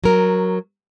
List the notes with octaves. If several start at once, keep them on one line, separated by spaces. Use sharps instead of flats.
F#3 A#4